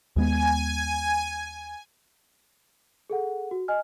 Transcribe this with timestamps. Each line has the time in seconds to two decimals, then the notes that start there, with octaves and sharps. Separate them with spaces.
0.16 D#2 G#3 B3 G#5
3.10 G#4 A4 F#5
3.51 F#4
3.68 D#5 G#5 F6